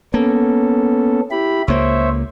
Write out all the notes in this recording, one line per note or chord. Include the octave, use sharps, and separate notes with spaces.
A#3 B3 C#4 A4
E4 G4 B5
C#2 A#3 C5 C#5 E5